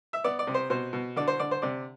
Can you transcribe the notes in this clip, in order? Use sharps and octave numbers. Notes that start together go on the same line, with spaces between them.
E5
B3 D5
D5
C3
C5
B2 C5
B2
D3 D5
C5
D3 D5
C5
C3 D5